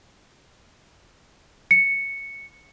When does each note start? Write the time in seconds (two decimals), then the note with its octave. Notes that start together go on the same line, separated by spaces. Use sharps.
1.71 C#7